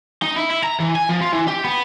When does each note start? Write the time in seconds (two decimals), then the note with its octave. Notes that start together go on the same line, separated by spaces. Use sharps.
0.23 D#4
0.37 E4
0.51 E4
0.64 A#5
0.80 E3
0.95 G#5
1.09 F3
1.21 F4
1.32 E3
1.48 G4
1.64 B3